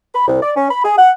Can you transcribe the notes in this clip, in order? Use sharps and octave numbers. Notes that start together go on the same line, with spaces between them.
B5
C2
D5
C#4
B5
G#4
F#5